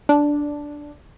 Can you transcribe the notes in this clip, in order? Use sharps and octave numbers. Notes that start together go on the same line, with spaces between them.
D4